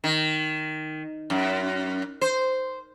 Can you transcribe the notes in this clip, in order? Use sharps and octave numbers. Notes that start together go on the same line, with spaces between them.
D#3
F#2
C5